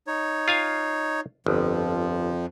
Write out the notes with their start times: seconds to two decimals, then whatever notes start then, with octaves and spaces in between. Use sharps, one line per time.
0.07 D#4 C#5
0.48 F4 F5 G#5
1.46 G1 F2 F3